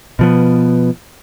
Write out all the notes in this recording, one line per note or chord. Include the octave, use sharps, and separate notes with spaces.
B2 F3 B3